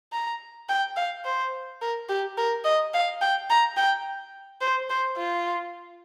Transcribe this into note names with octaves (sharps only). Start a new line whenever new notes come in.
A#5
G5
F5
C5
A#4
G4
A#4
D#5
F5
G5
A#5
G5
C5
C5
F4